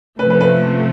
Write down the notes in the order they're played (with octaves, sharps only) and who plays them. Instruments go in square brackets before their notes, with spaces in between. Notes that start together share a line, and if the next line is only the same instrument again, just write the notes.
[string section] C3 F3 A3 [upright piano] B4
[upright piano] B4
B4